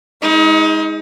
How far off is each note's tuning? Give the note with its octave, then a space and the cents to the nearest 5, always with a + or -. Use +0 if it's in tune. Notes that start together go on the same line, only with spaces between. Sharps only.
G#3 +0 D#4 +35